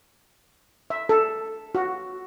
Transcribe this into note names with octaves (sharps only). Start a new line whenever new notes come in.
E5
A4
F#4